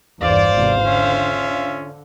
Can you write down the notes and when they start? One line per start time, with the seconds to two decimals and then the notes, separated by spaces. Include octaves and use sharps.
0.21 G1 E2 C5 D5 F5
0.54 G#1 E2 C3
0.85 D3 C#4 F4 E5